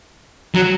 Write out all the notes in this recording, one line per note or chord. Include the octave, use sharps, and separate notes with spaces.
F#3